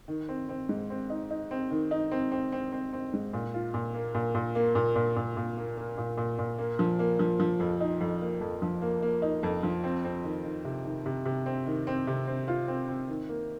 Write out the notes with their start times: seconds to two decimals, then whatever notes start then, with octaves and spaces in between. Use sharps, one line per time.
0.08 D#3
0.29 C4
0.49 C4
0.69 G#2
0.90 C4
1.10 D#4
1.30 D#4
1.51 C4
1.71 D#3
1.91 D#4
2.12 C4
2.32 C4
2.52 C4
2.72 C4
2.93 C4
3.13 G#2
3.33 A#2
3.54 F4
3.74 A#2
3.94 A#3
4.15 A#2
4.35 A#2
4.55 A#3
4.75 A#2
4.96 A#2
5.16 A#2
5.37 A#2
5.57 A#3
5.77 A#3
5.98 A#2
6.17 A#2
6.39 A#2
6.58 A#3
6.79 F3
6.99 A#3
7.19 F3
7.40 F3
7.60 F2
7.81 D#4
8.01 F2
8.21 A#3
8.41 F2
8.62 F3
8.82 A#3
9.02 A#3
9.22 D#4
9.43 F2
9.63 F3
9.84 C4
10.04 C4
10.24 D#3
10.44 D#3
10.65 C3
10.85 D#3
11.06 C3
11.25 C3
11.46 C4
11.67 D#3
11.87 C4
12.07 C3
12.28 C4
12.48 F4
12.68 C4
12.88 C4
13.09 D#3
13.29 A#3